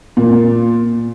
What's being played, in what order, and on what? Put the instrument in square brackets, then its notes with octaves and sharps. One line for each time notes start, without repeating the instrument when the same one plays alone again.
[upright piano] A#2